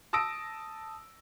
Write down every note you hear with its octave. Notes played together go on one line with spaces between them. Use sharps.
A5 D#6 E6 A#6 D7